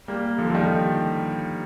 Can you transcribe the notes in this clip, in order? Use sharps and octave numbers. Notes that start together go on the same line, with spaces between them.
G3 A#3
D3 F3
F3
D#3 G3